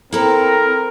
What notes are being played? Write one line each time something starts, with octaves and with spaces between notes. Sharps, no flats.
C4 E4 A4 A#4 A#5